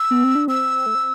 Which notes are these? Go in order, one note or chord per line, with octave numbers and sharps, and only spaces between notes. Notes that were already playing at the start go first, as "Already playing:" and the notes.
Already playing: E6
B3
C4
D4
C4 E6
A3
C4